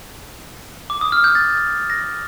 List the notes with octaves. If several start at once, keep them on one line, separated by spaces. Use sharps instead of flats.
D6
D#6
F6
G6
A6
A#6